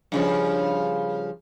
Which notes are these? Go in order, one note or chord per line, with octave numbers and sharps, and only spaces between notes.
G2 C#3 F3